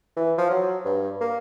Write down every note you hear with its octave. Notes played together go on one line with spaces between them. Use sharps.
E3
F3
F#3
G2
A#3